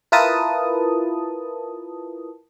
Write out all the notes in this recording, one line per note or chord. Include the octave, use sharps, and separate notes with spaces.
E4 F4 A#4 B4 A5 D#6